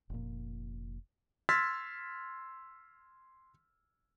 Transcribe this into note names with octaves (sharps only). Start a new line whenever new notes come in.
F1 A#2
C6 E6 F6 G#6 A6 B6